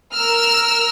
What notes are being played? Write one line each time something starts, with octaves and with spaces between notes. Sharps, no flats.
A#4 E6 F6